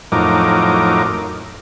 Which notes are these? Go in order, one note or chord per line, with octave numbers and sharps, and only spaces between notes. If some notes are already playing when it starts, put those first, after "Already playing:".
F2 A2 F#3 D#4 A#4 D6